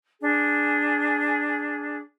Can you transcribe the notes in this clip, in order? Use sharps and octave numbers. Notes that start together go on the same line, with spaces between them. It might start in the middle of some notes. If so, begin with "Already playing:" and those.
D4 G#4